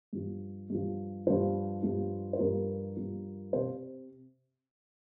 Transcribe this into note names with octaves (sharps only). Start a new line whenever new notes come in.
G2 F3
G2 F3
G2 F3 C5
G2 F3
C5
G2 F3 A#4
G2 F3
C3 C5